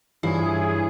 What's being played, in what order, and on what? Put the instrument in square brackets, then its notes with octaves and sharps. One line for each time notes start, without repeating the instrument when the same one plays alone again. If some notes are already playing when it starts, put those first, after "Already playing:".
[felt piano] G2 F4 C7 [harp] E3 C#5 [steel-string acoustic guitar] E4 [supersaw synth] G#4